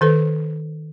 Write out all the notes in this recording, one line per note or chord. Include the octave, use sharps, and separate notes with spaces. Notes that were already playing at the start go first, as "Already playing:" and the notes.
D#3 A4 B4 C5